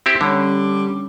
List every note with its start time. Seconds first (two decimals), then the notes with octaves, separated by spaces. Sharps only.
0.06 C4 E4 G4
0.21 D3 G3 C#4 C#5 B5